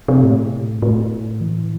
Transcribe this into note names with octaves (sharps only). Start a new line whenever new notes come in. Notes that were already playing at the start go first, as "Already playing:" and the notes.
C3
A2
A2
E3